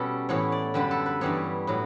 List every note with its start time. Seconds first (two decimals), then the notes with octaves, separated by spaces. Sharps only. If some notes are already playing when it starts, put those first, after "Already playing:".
Already playing: B2 G3 B3 C#4 A4
0.29 A2 E3 B3 C#5
0.52 D5
0.74 F#2 D3 G3 B4
0.91 A4
1.06 B4
1.21 G2 E3 G3 B3 C#5
1.67 A2 F#3 B3